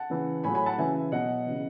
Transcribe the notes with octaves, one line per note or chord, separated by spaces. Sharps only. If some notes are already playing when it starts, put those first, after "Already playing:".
Already playing: F#5 A5
C#3 E3
A2 F#3 G#5 B5
G#5 B5
F#5 A5
C#3 E3 E5 G#5
B2 F#3 D#5 F#5
C#3 E3